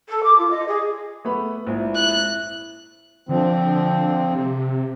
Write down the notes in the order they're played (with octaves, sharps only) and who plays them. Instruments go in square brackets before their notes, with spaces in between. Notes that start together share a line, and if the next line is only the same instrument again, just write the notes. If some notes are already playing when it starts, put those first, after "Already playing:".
[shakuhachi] A4
D6
F4
D#5
G#4
[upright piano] A3 B3 B5
[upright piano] A#1 G#2 [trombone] E4
[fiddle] F#6
[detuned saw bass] D3 [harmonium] F3 C4
[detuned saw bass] C3